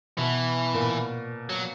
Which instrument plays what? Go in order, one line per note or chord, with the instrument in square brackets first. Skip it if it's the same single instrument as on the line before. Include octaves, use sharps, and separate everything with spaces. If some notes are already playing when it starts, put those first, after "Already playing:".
[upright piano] B2 [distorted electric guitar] E3
[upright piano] A#2
[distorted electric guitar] F#3